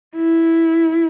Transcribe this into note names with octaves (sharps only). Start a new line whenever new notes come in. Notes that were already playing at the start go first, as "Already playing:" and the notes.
E4